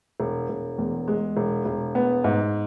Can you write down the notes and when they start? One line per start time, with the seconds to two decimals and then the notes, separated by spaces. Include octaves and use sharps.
0.20 E1
0.49 E1
0.78 E2
1.08 G#3
1.37 E1
1.65 E1
1.95 B3
2.24 G#2